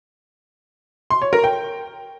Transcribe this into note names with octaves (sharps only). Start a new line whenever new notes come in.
C6
C#5
A#4
G5